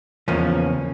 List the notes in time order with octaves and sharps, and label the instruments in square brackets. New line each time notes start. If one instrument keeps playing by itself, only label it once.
[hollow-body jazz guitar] E2 C#3 F3 A#3 C#4